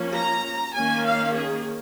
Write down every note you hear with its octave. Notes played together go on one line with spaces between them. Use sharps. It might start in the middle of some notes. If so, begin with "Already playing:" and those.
Already playing: F3 A#3 C#4
A#5
D#3 A#3 C#4 G#5
F5
G#4